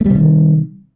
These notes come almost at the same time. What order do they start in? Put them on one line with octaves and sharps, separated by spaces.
A3 G3 C3 D#3